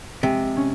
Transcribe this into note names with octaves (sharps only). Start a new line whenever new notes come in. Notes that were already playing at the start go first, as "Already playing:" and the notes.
C3 G#3
C#4